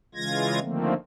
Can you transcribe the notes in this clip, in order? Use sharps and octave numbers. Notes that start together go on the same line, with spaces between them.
C#3 E3 G#3 F4 G#6 A#6
D3 D#3 F3 A3 A#3 C4